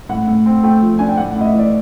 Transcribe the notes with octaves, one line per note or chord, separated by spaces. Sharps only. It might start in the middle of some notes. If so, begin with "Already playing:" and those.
A2 F#5
A2
C4
A3 G5
F3
D4 G#5
G5
A2 F#5
F#5
A2 D#5
E5
E3 D5